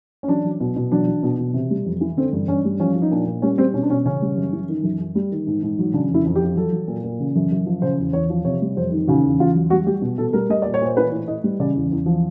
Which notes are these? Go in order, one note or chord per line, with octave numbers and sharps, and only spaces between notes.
C#4
F#3 D4
F#3
B2
B2
F#3 D4
F#3
B2
B2
C3
G3
F2
E3
D3 C4
G2
G2 C#4
G3
F3 C#4
F3
D#4
A#2 D4
A#2
G3 C#4
G3 C4
B2 C#4
D4
B2 C#4
C#3 C#4
G3
F#2
E3
D#3
F#2
F#2
G3
D#3
G#2
G#2
F#3
C#3 D4
F2 E4
F2
G4
F3
F#3 A4
F#3
A#2
A#2
C#3
F#2
F#2
F3
C#3 C5
E2
E2 C#5
F3
C3 C#5
G3
F2 C5
D#3
C#3 F#4
E2
E2 F4
F#3
G3 F#4
G3 G4
B2
B2 A4
G3 A#4
G3 D#5
A#2 D5
C#5
A#2 C5
E3 B4
A2
A2 D#5
G3
C#3 D5
E2
E2
F3